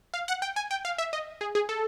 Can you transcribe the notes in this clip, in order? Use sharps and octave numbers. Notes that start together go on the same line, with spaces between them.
F5
F#5
G5
G#5
G5
F5
E5
D#5
G#4
G#4
A4